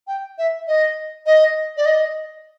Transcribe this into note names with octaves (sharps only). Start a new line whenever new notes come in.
G5
E5
D#5
D#5
D5
D#5